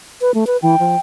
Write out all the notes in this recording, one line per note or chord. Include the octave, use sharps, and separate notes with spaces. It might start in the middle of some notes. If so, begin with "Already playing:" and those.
B4
A3
B4
E3 G5
F3